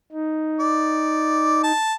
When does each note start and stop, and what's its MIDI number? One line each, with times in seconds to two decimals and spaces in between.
0.12 1.72 63
0.60 1.62 74
1.63 1.93 81